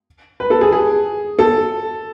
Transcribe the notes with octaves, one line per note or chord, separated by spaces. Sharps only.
B4
A4
G#4
G#4
A4